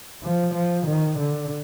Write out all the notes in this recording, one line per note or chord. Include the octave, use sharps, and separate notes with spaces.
F3
F3
D#3
D3